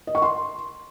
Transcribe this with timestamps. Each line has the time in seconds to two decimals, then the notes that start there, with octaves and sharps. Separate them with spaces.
0.07 D#5
0.15 C#6
0.22 C6